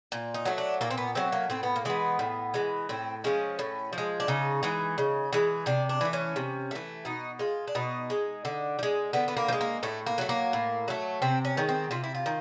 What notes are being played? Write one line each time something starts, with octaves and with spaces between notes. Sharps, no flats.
A#2
D#4
F#3 A3
D4
A#2 A#3
C4
B3
F#3 A3 C4
A#3
A2 C4
B3
A#3
E3 G#3 B3
A2
E3 G#3
A2 C4
F3 G#3 C#4
A2
F3
G#3
D4
C#3 D#4
E3 G#3
C#3
E3 G#3
C3 D4
D4
E3 A3
C#4
C3
E3 A3
B2 D#4
G#3 F4
D4
B2 D#4
G#3
D3
F3
G#3
D3 B3
B3
A#3
F3
G#3
A#3
A2 A3
A#3
F#3 A3
A#3
A2
F#3 A3
C3 C4
C#4
D#3 G#3
C4
C3 F4
E4
F4
D#3